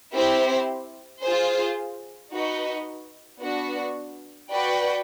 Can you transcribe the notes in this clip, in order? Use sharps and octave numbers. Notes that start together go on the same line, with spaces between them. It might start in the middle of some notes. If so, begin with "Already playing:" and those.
C4 E4 G4 C5
F4 G#4 C5
D#4 F#4 B4 D#5
B3 D4 F#4
F#4 B4 D5 G5